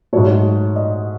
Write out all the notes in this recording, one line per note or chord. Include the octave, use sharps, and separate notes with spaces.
G#2 F#3 A3 C#5
D#5